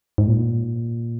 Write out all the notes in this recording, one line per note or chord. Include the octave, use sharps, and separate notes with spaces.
G#2
A#2